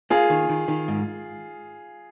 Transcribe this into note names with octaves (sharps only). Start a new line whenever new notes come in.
A#3 F4 G#4
D#3
D#3
D#3
G#2